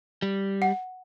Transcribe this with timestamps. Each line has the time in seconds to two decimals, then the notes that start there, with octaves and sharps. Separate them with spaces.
0.22 G3
0.62 F#5